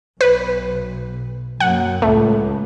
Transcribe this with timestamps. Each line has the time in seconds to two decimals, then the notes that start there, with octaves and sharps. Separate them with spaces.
0.21 B1 B4
1.60 F#2 A#3 F#5
2.02 C#2 A2 A3